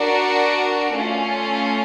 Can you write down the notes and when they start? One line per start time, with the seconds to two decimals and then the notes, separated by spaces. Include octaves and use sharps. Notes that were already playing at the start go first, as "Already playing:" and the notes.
Already playing: D4 F#4 A#4 D5
0.94 A3 C#4 F4